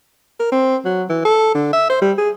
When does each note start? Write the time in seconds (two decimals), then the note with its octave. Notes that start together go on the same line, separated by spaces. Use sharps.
0.40 A#4
0.52 C4
0.85 F#3
1.09 E3
1.25 A4
1.55 D3
1.73 E5
1.90 C5
2.02 G3
2.18 G#4